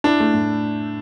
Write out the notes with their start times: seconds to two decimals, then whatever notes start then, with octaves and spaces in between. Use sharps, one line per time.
0.04 D4 E4
0.20 A3
0.34 A2